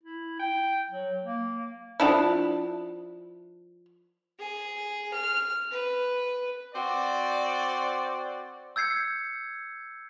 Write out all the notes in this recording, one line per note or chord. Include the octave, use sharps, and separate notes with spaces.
E4
G5
F#3
A#3
F3 D4 E4
G#4
F6
B4
C4 F#4 C5 D5
E6 G6 G#6 C7 C#7